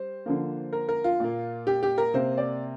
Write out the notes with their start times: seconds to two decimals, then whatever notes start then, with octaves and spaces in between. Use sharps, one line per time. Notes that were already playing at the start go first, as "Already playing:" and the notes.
Already playing: G3 C5
0.26 D3 F3 A#3
0.73 A#4
0.89 A#4
1.04 F4
1.20 A#2 A#3
1.67 G4
1.83 G4
1.98 A#4
2.14 C3 A#3 C5
2.37 D5